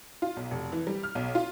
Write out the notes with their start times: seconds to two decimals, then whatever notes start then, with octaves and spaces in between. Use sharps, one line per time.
0.22 F4
0.37 B1
0.51 F1
0.72 E3
0.87 G3
1.03 F6
1.15 B1
1.35 F4